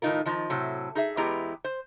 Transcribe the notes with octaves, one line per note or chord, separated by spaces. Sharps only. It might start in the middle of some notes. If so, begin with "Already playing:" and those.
A2 D#3 F#3 D#4 F4 A#4
D#3 F3 D#4
A2 C3 F#3
D#4 G#4 E5
E2 G#3 B3 E4 G4 A#5
C5